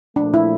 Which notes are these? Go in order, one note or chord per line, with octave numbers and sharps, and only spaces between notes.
A#2 F3 A3 D4
E4